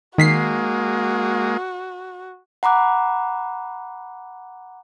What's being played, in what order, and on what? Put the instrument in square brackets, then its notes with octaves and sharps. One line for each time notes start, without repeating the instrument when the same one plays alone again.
[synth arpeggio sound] D#3 B6 C7 [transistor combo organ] G#3 A#3 [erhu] F#4
[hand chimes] F#5 A#5 B5 D6 F#6